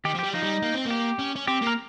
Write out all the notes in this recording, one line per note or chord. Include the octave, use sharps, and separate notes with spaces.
D#3 G4
F3
G3 G4
F3 D#4
G3
A#3
C4
A#3 G4
C#4
C#4
C4 G4
A#3 A#4